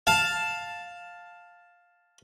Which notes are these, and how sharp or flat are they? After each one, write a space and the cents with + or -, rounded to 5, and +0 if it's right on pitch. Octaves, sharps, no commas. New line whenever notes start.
F5 +10 A5 +0